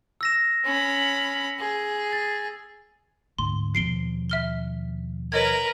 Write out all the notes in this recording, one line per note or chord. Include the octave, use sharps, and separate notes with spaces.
E6 A#6 E7
C#4 B5
G#4
A6
D2 G#2 C6
D#2 B2 F3 C7 D7 G7
E5 F6 G7
A#4 B4 C#5 D#5 G#6